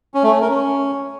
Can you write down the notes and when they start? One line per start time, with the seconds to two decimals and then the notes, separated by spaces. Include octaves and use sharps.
0.14 C#4
0.23 A3
0.32 C#4
0.41 A#4
0.50 C#4